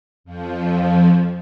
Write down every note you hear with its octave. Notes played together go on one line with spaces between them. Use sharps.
F2 F3